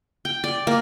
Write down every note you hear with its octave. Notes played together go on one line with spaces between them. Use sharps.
G5
D5
A#3